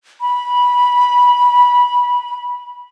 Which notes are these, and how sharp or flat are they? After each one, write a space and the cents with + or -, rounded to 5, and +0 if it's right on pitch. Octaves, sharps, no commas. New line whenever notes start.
B5 -15